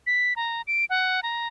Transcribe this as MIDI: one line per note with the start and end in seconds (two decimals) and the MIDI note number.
0.07 0.33 95
0.36 0.62 82
0.67 0.85 98
0.90 1.20 78
1.23 1.48 82